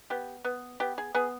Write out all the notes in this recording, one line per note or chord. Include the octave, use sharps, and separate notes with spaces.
B3 G4
B3
B3 G4
G#4
B3 G#4